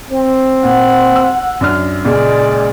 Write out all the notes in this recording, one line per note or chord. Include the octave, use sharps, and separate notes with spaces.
C4
A#2 F#5
E6
F#2 D4 F6
C#2 A#2 G#3 D5